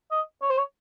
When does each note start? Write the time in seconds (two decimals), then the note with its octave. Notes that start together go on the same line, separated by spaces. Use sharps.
0.11 D#5
0.42 C#5
0.50 C5
0.57 C#5